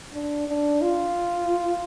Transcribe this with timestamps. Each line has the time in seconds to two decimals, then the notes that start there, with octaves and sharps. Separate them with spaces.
0.13 D4
0.48 D4
0.82 F4